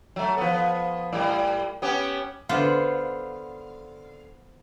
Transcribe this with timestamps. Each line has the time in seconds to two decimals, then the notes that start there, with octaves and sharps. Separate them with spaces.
0.16 F#3 A3
0.37 F3 B3
1.13 A2 G3
1.82 B3 C#4 G4
2.49 D3 B3 F4 C5 F5